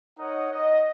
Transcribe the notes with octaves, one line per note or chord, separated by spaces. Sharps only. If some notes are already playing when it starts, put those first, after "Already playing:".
D#4 A#4 C#5 D#5 F#5 D#6
D#5